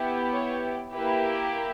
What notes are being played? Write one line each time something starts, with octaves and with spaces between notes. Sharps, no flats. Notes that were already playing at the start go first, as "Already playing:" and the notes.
Already playing: B3 E4 G4
C#5
A#3 E4 G4 B4